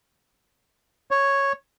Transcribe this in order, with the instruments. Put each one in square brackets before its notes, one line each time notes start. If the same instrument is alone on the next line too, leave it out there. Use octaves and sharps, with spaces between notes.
[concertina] C#5